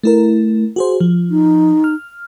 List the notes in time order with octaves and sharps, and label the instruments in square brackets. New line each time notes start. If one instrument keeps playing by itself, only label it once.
[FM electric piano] A3 E4 A#4
F#4 G#4 C5
F3
[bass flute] D#4
[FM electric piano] F6